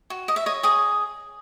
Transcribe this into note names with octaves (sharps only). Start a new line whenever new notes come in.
F#4
D#5
E5
C#5 D#5
G#4 D#5